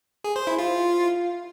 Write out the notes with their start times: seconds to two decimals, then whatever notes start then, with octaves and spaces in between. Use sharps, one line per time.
0.24 G#4
0.36 C5
0.47 E4
0.58 F4